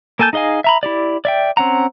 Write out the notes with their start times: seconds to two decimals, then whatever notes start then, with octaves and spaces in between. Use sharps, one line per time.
0.19 A#3 A4 G#5 A5 G6
0.33 D#4 G#4 D#5 F5 G#5
0.64 E5 A#5 B5
0.83 E4 G4 D5
1.25 D5 E5 G5
1.57 C4 C#4 F#5 A#5